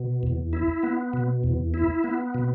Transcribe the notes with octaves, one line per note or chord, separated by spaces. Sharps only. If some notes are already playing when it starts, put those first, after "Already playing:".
Already playing: B2
E2
E4
B3
B2
E2
E4
B3
B2